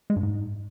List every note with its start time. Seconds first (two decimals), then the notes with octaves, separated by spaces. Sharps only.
0.10 G#3
0.16 G2
0.23 G#2